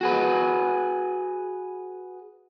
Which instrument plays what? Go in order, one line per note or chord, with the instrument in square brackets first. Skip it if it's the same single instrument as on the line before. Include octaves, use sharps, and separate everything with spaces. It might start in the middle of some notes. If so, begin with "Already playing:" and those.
[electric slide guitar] F#4 G#4 B4